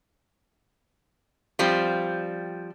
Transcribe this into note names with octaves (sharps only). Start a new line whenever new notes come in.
F3 G3 C4